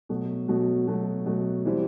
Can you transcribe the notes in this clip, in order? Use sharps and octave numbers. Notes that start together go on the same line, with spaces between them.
B2 F#3 A3
B2 F#3 A3
B2 F#3 A3
B2 F#3 A3
E3 G3 C4 E4